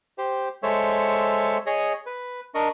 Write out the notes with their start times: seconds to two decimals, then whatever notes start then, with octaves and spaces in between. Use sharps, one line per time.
0.18 G4 C5
0.63 G#3 A4 C5 C#5 E5 C#6
1.66 G#4 C#5 D#5
2.06 B4
2.55 D4 A#4 D#5 C#6